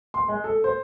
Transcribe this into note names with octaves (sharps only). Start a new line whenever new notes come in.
C6
G#3
A4
C5